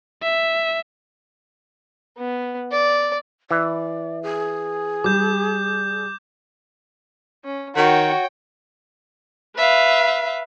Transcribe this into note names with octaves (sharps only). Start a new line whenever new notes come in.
E5
B3
D5
E3 D5
G#4
G3 D6 G6
C#4
D#3 F#4 C#5 G5
B4 E5 F5